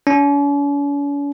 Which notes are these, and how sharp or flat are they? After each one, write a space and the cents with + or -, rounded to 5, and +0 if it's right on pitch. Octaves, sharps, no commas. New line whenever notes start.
C#4 +45